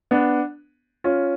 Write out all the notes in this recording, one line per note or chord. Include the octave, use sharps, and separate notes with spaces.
B3 D4
C#4 F4